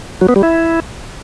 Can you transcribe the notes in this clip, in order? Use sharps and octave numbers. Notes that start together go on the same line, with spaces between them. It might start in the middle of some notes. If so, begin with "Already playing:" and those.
F#3
B3
G3
E4